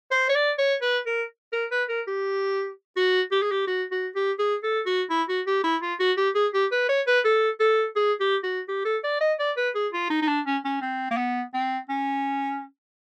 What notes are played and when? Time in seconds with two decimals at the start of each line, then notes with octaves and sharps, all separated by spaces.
0.11 C5
0.29 C#5
0.35 D5
0.58 C#5
0.82 B4
1.06 A#4
1.53 A#4
1.71 B4
1.89 A#4
2.07 G4
2.96 F#4
3.32 G4
3.42 G#4
3.51 G4
3.67 F#4
3.91 F#4
4.16 G4
4.39 G#4
4.64 A4
4.86 F#4
5.10 E4
5.29 F#4
5.47 G4
5.64 E4
5.82 F4
6.00 F#4
6.17 G4
6.35 G#4
6.54 G4
6.72 B4
6.89 C#5
7.07 B4
7.25 A4
7.60 A4
7.96 G#4
8.20 G4
8.43 F#4
8.68 G4
8.85 A4
9.03 D5
9.21 D#5
9.39 D5
9.57 B4
9.75 G#4
9.93 F4
10.10 D#4
10.22 D#4
10.28 D4
10.46 C#4
10.65 C#4
10.81 C4
11.11 A#3
11.17 B3
11.54 C4
11.89 C#4